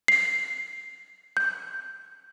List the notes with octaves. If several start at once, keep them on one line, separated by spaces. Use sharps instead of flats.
C7
G6